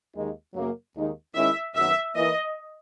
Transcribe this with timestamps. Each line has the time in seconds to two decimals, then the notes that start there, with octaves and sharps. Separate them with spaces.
0.15 D#2 D#3 G#3 D#4
0.54 F#2 C#3 F#3 A#3
0.95 D#2 D#3 G#3 D#4
1.35 D#3 G#3 C#4 E4 E5
1.75 F#2 D#3 F#3 B3 E5
2.15 E3 A#3 E4 D#5